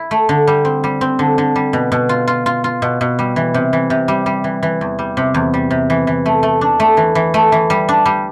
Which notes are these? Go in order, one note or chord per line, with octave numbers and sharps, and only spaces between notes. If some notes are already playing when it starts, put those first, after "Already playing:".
Already playing: E4
A3
D3
G3
C4
G3
C4
D3
D3
G3
B2
B2
F4
F4
F4
F4
B2
B2
G3
E3
C3
E3
C3
G3
G3
E3
E3
E2
G3
C3
E2
G3
C3
E3
E3
A3
A3
D4
A3
E3
E3
A3
E3
G3
D4
G3